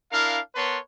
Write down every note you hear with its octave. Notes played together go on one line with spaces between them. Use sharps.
D4 E4 A#4 F5
B3 A#4 B4 C#5 A5 C6